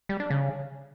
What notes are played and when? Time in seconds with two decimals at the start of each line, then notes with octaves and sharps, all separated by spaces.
0.09 G3
0.20 D4
0.30 C#3